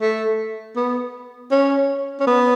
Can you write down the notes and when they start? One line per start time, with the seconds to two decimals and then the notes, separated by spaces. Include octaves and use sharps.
0.01 A3
0.76 B3
1.52 C#4
2.21 C#4
2.27 B3